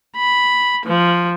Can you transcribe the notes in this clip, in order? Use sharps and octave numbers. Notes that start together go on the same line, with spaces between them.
B5
F3